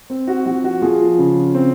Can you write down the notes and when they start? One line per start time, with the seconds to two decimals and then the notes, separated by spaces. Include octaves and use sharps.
0.10 C4
0.28 F#4
0.45 F3 F#4
0.64 F#4
0.82 F3 F4 G#4
1.18 C#3
1.54 C4